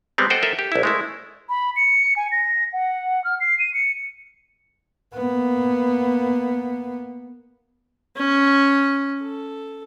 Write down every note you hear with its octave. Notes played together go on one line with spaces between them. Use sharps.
G3 G#3 B3 C4
A4 C5 D#5 F#5 G5
A4 A#4 D#5 E5
G4
A#1 E4
G#3 A3 E4
B5
C#7
G#5
A#6
F#5
F6
C7
D#7
C#7
A#3 B3
C#4
A4